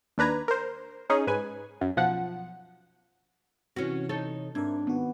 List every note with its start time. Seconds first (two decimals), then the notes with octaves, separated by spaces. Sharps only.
0.18 D#2 D4 B4 A#5 G#6
0.48 A#4 C5
1.10 C#4 D#4 G#4
1.27 G#2 B4 G#5
1.81 F#2
1.96 B1 F3 F#5
3.76 C3 E3 C#4 F#4
4.09 D#4 A4 C#5
4.55 G#2 C4 D4 A#4 E5 G#6
4.87 D#3 B3 F#4